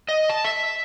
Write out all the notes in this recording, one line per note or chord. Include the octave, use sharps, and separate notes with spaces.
D#5
A5
E5